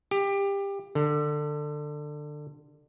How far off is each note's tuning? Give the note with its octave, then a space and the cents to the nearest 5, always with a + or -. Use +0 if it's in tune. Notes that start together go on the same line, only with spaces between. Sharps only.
G4 +20
D3 +20